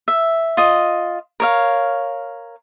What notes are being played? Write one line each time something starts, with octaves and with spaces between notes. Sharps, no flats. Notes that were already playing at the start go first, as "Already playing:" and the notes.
E5
F4 D#5
A#4 C#5 F5